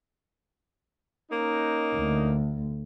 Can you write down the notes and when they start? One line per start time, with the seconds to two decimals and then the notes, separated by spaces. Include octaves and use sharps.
1.31 A#3 C#4 D#4
1.95 D2